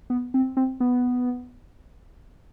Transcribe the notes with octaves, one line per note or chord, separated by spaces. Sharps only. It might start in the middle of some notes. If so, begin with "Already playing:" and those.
B3
C4
C4
B3